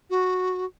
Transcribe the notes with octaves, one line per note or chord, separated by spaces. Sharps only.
F#4